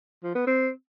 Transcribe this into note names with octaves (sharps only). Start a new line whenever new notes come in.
F3
B3
C4